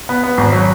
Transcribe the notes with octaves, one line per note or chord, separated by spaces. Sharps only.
B3
B3
G#1
F#3